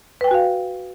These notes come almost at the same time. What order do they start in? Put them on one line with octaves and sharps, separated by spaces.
B4 G5 G#5 F#4 F5